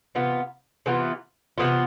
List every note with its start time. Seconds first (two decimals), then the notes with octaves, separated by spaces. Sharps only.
0.15 C3 E3 B3 F4
0.86 C3 E3 B3 F4
1.58 C3 E3 B3 F4